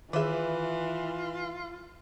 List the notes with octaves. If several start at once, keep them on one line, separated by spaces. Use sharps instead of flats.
D#3 E3 F4 G#4 B4 E5